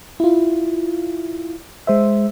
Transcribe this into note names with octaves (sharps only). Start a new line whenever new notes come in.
E4 F4
G#3 C5 E5